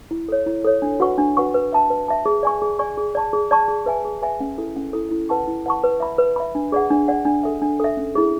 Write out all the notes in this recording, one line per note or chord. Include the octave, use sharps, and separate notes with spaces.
E4
A4 C#5
E4
A4 C#5
D4
F#4 B4 F#5 C#6
D4
F#4 B4 F#5 C#6
B4
E5 A5
B4
E5 A5
G#4
D5 G#5 C#6
G#4
D5 G#5 C#6
G#4
D5 A5 C#6
G#4
D5 A5 C#6
G#4
B4 E5 G#5
G#4
B4 E5 G#5
C#4
E4 A4
C#4
E4 A4
E4
B4 F#5 A5 C#6
E4
B4 F#5 A5 C#6
B4
E5 B5
B4
E5 B5
D4
G#4 D5 F#5
D4
G#4 D5 F#5
D4
A4 E5
D4
A4 E5
C#4
E4 G#4